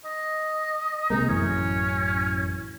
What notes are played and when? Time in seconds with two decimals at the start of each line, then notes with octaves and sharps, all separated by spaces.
0.05 D#5
1.10 C3 G#3 A#3 D#4
1.29 A1 F#2 E3 C#4